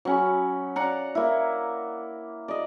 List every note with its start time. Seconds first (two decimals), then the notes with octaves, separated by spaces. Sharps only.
0.05 F#3 C#4 B5
0.76 D5 F5 F#5 A#5
1.15 A#3 E4
2.48 D5 D#5